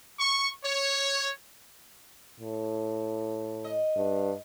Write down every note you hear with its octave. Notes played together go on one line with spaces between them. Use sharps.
C#6
C#5
A2
D#5
G2